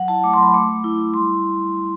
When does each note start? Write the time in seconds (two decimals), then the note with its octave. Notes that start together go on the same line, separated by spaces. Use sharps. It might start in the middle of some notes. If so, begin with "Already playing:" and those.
Already playing: F#3 F#5
0.08 E4 A5
0.24 A3 D6
0.34 C6
0.38 F#3 B5
0.54 A3 D6
0.69 A3
0.84 E4
0.98 E4
1.14 G3 C6